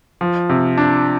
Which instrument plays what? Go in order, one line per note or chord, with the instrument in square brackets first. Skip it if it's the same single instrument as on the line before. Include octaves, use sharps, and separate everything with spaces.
[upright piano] F3
C3
D4